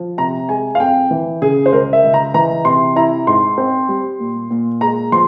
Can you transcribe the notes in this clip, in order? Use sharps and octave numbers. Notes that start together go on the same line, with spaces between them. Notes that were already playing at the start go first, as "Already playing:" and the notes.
Already playing: F3
C3 A#5
G#3 G#5
F5
F2 G5
E3
C#3 G#4
C5
C#2 A#4
E5
C#2
A#5
E3 A#5
C3 C6
E4 A#5
G#2 C6
C4
G3
A#2
A#2
G#3 A#5
F3 C6